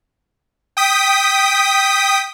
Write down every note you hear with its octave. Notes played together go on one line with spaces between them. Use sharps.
G5 D#6 B6